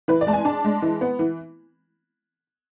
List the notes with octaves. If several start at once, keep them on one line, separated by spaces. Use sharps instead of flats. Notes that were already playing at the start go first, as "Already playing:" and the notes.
E3 B4
D5
G#3 A5
G#5
D4 A5
G#3
E3
B3
E3